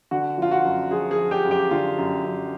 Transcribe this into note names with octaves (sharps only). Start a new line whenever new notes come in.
D3 F#4
F3 F4
F#4
F#2
F3 G#4
G#4
F3
G4
F#2
G4
D3 F4
F#2
F#2